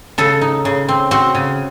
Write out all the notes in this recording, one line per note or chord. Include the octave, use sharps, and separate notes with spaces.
C#3 A4
D#4
C#3
C4
C4 F#4
C#3